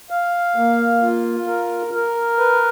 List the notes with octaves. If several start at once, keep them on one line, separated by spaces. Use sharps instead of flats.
F5
A#3
F4
A#4
A#4
B4